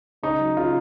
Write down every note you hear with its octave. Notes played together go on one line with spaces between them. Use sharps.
C#3 D#4
F#3
C#3 F4